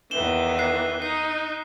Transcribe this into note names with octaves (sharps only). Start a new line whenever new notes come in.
E2 D#3 E3 E7 G7
F#6 C7
D#4 C7